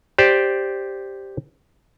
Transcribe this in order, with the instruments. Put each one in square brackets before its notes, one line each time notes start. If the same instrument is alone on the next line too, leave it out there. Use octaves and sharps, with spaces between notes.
[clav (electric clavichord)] G4 C5 D5